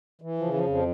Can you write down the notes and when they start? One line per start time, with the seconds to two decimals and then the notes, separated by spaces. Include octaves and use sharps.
0.22 E3
0.38 F3
0.43 C#3
0.54 F3
0.65 F2 F3